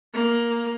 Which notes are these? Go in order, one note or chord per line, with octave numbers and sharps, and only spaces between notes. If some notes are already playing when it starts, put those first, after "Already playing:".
A#3